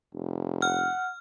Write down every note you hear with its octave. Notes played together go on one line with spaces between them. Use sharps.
F1
F#5 F6